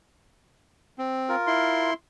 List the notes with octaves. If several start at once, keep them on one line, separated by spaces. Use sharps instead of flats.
C4
F4 A#4
E4 C6